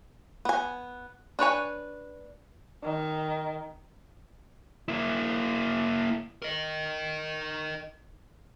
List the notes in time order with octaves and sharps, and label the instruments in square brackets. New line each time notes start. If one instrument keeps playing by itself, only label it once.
[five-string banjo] B3 G#5
D4 B4 C#5 G#5
[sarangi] D#3
[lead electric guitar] A#3 E4
A#4 D#5